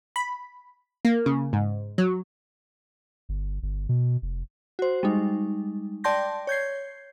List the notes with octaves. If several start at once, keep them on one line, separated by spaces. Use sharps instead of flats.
B5
A#3
C#3
G#2
F#3
G1
G1
B2
F1
F#4 C5
G3 G#3 D#4
D5 G5 A5 C6 G6 A#6
C#5 G6 G#6 C7